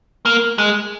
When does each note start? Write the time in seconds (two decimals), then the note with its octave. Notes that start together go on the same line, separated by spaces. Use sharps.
0.25 A#3
0.58 G#3